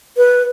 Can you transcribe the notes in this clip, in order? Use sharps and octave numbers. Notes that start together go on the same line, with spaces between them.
B4